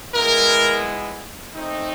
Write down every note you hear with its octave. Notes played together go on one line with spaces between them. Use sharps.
G#3 B3 E4 A#4
A3 C4 D#4